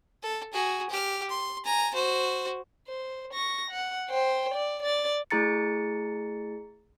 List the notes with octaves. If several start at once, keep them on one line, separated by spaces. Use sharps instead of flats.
A4
F#4 G#4
G4 F6
C6
G#5 A#5
F#4 C5
C5
C#6 A#6
F#5
C5 G5
D5
D5 A6
A3 E4 G#4 A#5 A6 C#7